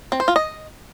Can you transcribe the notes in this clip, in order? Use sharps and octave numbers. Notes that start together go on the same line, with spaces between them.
C4
C5
F4
D#5